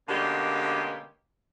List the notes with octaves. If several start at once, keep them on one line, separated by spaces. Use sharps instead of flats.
B2 D3 G#3 A#3 C#4 G4